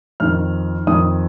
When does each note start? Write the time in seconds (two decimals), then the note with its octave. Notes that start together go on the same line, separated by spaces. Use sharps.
0.20 F2 D#3 F6
0.87 F2 D#3 D#6